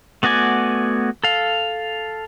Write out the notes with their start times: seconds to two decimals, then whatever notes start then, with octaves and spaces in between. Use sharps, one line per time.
0.23 A3 B3 F#4 D5 G#5
1.24 A4 F5